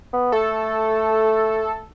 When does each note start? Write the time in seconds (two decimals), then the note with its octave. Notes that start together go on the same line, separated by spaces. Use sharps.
0.13 B3
0.32 A3 A4